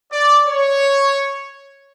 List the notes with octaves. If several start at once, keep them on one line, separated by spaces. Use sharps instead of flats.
D5
C#5